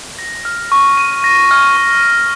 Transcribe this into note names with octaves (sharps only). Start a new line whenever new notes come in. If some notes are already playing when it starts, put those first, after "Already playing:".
A#6
F6
C#6
D#7
A#6
F6
C#6
D#7